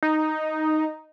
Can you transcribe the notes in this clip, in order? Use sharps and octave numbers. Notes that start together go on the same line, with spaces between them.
D#4